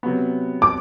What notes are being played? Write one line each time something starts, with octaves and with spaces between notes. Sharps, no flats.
C3 F#3 B3
D6